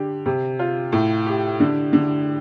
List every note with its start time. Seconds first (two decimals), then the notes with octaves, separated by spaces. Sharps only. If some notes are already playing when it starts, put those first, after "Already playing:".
Already playing: D3 G4
0.26 C3
0.59 F4
0.92 A2
1.26 G4
1.60 D3
1.93 D3